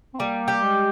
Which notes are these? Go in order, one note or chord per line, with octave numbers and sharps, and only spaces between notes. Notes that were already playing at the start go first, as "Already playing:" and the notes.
C4
G3 A#3
G4
G#3